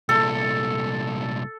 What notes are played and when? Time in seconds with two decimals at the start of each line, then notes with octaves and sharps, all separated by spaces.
0.09 C2 A#2 A4